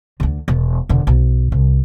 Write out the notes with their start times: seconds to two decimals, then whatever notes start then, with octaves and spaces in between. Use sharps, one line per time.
0.20 D2 D3
0.48 E1
0.89 E1 D3
1.07 B1
1.52 C2